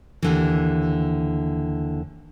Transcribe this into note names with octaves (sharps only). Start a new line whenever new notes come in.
D#2 D3 E3